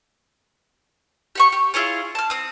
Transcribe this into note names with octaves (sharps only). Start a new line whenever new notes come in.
G4 F#5 C#6
G4
E4 F4 G#4 C#5
A5 F6
C4 D#6